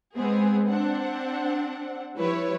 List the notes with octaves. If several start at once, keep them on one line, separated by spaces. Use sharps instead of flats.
G#3 B3 C4 G#4
C4 D4 F#5
F3 G3 E4 B4 C#5